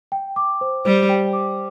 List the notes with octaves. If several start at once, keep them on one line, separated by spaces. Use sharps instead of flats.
G5
D6
C5
G3 C5
G5
D6